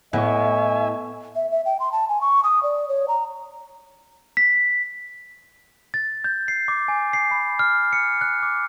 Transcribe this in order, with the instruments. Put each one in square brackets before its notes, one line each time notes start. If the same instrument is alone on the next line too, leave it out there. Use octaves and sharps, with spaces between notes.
[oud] A2 [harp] B3 C#6 [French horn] D#5 [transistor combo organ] E5 G#5
[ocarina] E5
E5
G5
C6
A5
G#5
C#6
D#6
D5
C#5
A#5
[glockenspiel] B6
A6
G6
C7
D6
G#5
C7
B5
F6
C#7
F#6
D6